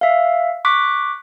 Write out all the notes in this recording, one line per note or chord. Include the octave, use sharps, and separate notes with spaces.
E5 F5
C#6 D6 F#6 B6